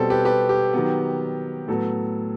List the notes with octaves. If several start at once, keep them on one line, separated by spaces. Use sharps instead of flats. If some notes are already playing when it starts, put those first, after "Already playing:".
Already playing: B2 G3 C4 A4
G4 B4
G4 B4
G4
D#3 F#3 B3
A2 F#3 B3 A4